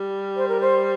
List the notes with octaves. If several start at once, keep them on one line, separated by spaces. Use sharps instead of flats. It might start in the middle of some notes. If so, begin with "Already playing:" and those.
Already playing: G3
C5
A#4
C5